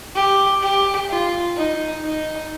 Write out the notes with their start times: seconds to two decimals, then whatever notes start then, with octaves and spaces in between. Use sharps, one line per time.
0.15 G4
0.62 G4
1.10 F4
1.57 D#4
2.04 D#4